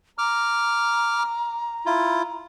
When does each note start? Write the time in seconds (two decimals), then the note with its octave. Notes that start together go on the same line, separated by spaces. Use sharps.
0.18 A#5 D6 F6
1.86 E4 F4